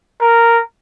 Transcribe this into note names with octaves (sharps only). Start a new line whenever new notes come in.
A#4